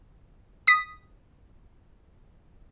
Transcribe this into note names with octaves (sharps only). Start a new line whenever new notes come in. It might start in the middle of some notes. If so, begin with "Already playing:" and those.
D#6 B6